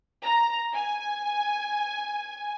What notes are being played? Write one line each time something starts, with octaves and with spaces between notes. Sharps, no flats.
A#5
G#5